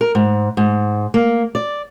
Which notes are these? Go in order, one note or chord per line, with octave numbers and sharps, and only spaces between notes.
A#4
G#2
G#2
A#3
D5